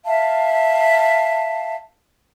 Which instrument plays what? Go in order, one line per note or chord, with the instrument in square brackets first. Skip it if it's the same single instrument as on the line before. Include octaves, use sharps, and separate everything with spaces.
[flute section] E5 F5 A5